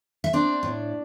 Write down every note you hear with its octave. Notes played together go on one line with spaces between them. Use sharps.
E5
C4 D4 D5
A2